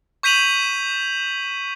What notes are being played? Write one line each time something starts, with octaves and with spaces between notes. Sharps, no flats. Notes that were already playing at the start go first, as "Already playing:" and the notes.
C#6 G6 B6 D#7 F7 F#7